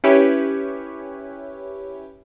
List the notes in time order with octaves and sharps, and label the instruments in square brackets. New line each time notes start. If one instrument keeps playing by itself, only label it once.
[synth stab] C#4 E4 G4 B4 C#5